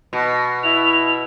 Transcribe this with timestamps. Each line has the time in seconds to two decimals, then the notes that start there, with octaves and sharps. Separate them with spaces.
0.13 B2
0.63 E4 F7